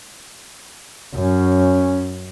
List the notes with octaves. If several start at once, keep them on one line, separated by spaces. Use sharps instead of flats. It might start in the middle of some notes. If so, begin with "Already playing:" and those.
F#2 C#4